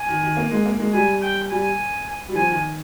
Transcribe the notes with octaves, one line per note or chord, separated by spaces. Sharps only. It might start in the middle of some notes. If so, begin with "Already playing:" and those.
Already playing: G#5
D#3
D#3
A#3
G#3
A#3
G#3
G3 G#5
G5
G3 G#5
G3
F3 G#5
D#3